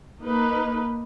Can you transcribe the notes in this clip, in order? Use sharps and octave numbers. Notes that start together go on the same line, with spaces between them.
A#3 D#4 B4